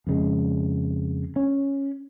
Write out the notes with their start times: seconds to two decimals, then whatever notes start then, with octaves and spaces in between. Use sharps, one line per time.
0.07 F2 C#3 G#3
1.36 C#4